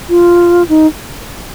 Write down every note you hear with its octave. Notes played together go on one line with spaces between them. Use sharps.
F4
D#4